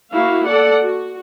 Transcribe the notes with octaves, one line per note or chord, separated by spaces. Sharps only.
A#3 E4 F#4 F5
A4 D5 F#5
F#4